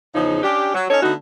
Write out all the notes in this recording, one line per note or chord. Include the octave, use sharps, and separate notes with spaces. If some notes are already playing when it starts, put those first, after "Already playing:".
E2 C#3 F3 D#4
C#4 D4 G4
F#3
C#4 D#4 A4 C#5
D3 A3 B3 D#4 F#4